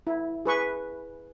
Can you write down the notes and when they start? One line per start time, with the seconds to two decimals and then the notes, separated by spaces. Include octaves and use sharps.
0.07 E4
0.46 G#4 B4 C#6